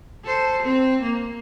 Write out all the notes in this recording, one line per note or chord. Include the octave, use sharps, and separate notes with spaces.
A4 C5
C4
A#3